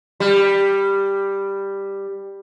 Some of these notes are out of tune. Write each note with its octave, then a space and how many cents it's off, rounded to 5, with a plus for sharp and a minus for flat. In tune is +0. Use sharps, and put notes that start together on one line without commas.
G3 +5